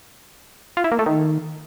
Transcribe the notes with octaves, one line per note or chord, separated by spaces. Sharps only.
F4
E4
A#3
A3
D#3